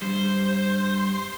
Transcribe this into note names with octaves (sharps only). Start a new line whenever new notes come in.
G2 G3 C5